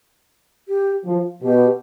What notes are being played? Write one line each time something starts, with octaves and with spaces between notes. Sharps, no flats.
G4
F3
B2 G4